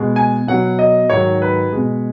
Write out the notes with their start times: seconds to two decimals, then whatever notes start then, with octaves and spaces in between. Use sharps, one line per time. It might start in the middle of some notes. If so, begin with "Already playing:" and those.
Already playing: B2 G#3
0.16 G#5
0.47 B2 F#3 F#5
0.79 D#5
1.10 G#2 D#3 F#3 C#5
1.42 B4
1.73 B2 G#3